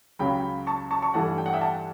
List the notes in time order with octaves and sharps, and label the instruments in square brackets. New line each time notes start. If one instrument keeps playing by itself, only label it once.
[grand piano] C#2 C#3 F#3 G5 B5
A5 C#6
A5 C#6
A5 C#6
G2 E3 A3 F#5 A5
G5
F#5
E5 G5
F#5 A5